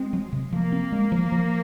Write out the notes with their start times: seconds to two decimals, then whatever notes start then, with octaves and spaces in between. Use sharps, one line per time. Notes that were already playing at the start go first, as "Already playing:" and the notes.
Already playing: G#3 C4
0.13 F#3
0.32 C3
0.53 F3 A#3
0.72 C4
0.92 G#3
1.12 F3
1.32 F3